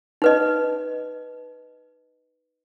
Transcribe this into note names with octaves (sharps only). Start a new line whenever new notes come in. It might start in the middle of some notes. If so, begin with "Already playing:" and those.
D#4 B4 D#5